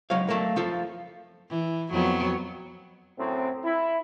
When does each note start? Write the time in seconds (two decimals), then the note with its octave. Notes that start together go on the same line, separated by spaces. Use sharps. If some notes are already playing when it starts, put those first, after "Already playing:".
0.10 C#2 F#3 C#5 F5
0.29 F#3 A3 A#3 A#4
0.56 F3 F4 A4
1.49 E3
1.91 F2 F#3 B3
3.19 F#2 A2 C4
3.65 E4